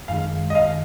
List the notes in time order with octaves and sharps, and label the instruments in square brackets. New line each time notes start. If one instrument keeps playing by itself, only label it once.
[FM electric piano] F#2 D#3 G#3 [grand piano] F5
[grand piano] D#5
F5